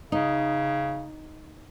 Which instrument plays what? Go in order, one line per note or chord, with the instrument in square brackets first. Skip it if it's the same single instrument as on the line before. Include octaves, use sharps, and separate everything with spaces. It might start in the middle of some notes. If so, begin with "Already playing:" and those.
[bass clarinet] C#3 [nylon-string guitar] D#4